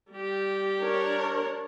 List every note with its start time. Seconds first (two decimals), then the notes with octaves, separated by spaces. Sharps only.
0.12 G3 G4
0.80 D4 A#4 C#5